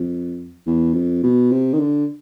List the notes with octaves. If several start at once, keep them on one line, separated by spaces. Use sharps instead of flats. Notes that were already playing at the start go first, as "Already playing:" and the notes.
Already playing: F2
E2
F2
B2
C3
D#3
D3